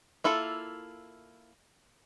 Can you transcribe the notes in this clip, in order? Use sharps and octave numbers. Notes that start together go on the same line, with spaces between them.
A#3 E4 F4 A4